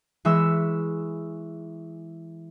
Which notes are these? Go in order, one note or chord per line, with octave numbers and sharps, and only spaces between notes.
E3 G#3 E5 C#6 E6